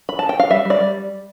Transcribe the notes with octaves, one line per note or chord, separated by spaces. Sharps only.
B5
A5
G5
F5
G3 E5
G3 D5
G3